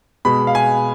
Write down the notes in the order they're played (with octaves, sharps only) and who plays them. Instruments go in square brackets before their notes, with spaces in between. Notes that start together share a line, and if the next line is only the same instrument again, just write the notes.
[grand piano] B2 G#3 B5
F5
G#5